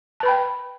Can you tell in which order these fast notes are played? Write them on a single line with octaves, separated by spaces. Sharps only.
A5 B4 B5 G5